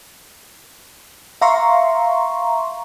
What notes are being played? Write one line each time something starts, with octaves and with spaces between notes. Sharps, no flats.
E5 F5 A#5 C6 C#6